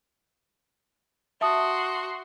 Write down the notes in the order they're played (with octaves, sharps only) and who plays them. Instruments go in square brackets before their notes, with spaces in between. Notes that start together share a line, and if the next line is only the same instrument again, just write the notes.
[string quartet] F#4 C6 [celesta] E5 A5 D#6